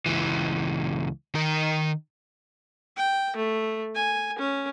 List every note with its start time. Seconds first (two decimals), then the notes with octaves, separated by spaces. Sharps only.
0.06 C#2 E3
1.35 D#3 A#4
2.97 G5
3.36 A3
3.95 G#5
4.39 C#4